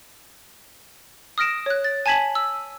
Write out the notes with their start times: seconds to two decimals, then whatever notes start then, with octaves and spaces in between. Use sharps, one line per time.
1.38 D#6 F6 A#6 D7 E7
1.66 C#5 F#6
1.84 A6
2.06 G#5 A5 G#6 B6 F#7
2.35 E6